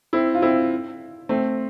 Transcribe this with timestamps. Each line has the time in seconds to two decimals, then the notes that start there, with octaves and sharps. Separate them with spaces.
0.13 C4 E4
0.35 F4
0.42 C4 E4
1.29 A3 C4